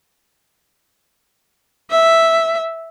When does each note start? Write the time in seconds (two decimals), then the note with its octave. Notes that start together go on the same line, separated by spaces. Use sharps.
1.91 E5